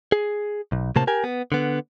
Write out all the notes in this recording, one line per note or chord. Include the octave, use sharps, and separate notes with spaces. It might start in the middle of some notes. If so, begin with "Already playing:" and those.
G#4
B1
A2 C3 A#3 C5 A5
G4 A#4 G#5
B3
D3 B3